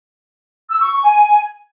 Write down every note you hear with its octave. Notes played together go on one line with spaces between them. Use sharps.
E6
C#6
C#6
G#5